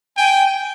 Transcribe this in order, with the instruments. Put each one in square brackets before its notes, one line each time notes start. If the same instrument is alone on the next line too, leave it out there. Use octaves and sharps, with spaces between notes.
[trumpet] G5 [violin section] G#5